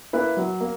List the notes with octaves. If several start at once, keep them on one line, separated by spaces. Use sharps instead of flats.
A#3 E4 B4
F#3
A#3